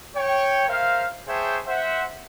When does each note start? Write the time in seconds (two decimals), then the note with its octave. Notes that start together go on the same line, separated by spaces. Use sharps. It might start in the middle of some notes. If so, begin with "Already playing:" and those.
0.16 C#5 G5
0.68 A#4 C5 E5 F5
1.28 G#4 C5 C#5 E5 G5 A5
1.68 C5 E5 F#5